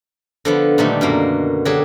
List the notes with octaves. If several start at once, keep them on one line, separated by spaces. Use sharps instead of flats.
D3 F3 B3
A#2 D3 D#3 G3 A3
F#2 B2 A#3
D3 F#3 G4 G#4